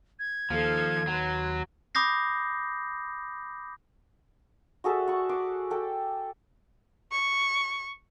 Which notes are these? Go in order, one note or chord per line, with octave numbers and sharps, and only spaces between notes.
G#6
D#2 F3 D#4 A4 F5
F#3 B4 C6
B5 D6 D#6 G6 A#6 C7
F#4 G#4 A4 E5
F#5 C#6
C6 D6
A4 G5
C#6